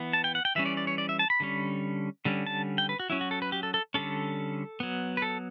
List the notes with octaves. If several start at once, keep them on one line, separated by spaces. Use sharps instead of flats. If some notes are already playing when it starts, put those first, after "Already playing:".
Already playing: E3 B3
A5
G5
F#5
G5
E3 G3 C#4 E5
D5
D5
C#5
D5
E5
A5
B5
D3 G3 C#4
D3 G3 C#4
A5
G5
B4
F#4
F#3 C#4 E4
F#4
A4
B4
G4
A4
A4
D3 G3 C#4 A4
F#3 B3
B4
A4